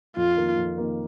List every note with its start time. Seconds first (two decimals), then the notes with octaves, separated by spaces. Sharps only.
0.16 F2 F4
0.37 D#3 A#3
0.57 F2
0.78 D#3 A#3